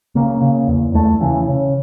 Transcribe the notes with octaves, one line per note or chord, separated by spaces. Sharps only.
C#3 A#3
C#3
E2
E2 A3
C#3 E3
C#3